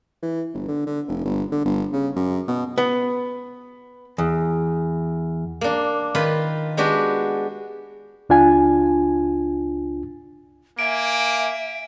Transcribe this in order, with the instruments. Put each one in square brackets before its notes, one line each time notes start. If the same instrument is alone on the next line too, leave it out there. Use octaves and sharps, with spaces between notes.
[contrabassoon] E3
G1
D3
D3
F1
G1
D3
G1
C#3
F#2
B2
[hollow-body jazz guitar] B3
E2
[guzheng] A#3 D4
D#3 F4 B4 B5
G#3 B3 D4 F#4 G4
[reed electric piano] C#2 D4 F4 G#5
[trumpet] A#3 [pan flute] E5 [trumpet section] G#5 [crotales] D7